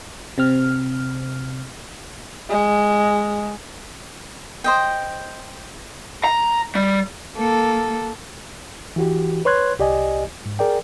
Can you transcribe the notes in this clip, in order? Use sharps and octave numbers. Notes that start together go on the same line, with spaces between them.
C3 C4 F6
G#3
C5 D#5 G5
A#5
G3
A#3 A4
E3 F#4 G4
B4 C#5 C6 F#6 G#6
C2 G4 D5 D#5 G#5
G#2
G#4 A#4 D5 G5